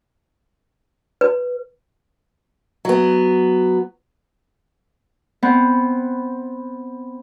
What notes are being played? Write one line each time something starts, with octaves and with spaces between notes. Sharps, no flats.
B4
F#3 B3
B3 C4